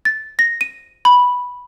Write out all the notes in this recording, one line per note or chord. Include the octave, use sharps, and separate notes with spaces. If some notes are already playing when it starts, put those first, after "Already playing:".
A6
A#6
D#7
B5